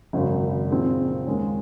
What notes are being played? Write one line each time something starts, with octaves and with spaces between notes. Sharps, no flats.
G#1 F#2 C#3
A#2 F3 C4 D#4 G#4
D#2 D#3 G#3 C#4